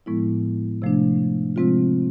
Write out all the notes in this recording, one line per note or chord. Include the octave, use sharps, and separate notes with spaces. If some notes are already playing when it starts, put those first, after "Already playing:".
A2 F3 G#3 B3 E4
C3 F3 A3 D4
C3 F3 G#3 C4 F4